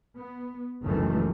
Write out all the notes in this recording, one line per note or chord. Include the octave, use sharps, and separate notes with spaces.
B3
F1 C#2 F#2 D#3 E3 A3